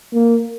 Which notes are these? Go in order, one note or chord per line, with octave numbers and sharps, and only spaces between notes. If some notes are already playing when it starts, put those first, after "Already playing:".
A#3